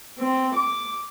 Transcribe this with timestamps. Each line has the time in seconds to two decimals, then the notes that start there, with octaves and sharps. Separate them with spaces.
0.18 C4
0.55 D6